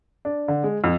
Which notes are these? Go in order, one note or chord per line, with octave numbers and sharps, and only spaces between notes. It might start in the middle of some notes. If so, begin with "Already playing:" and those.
D4
D3
G#3
F2